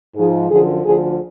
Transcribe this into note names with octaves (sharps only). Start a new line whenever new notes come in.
G#2 F3 G#4
F#2 D3 F3 G#4
D2 D3 F3 G#4